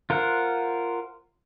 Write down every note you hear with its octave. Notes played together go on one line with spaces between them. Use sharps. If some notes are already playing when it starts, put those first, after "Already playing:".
F4 A#4 C5 F#5